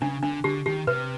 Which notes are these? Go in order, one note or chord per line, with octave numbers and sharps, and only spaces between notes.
C#3 D4
D3 D4
D3 G4
D#3 G4
C3 B4